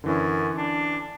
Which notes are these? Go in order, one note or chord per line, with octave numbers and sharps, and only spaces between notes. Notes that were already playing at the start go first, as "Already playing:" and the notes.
F#2 D3 E3 C#4
D4